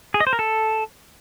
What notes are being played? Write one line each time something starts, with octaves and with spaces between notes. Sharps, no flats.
G#4
D#5
C5
A#4
A4